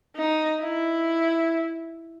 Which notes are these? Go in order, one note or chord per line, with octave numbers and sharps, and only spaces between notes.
D#4
E4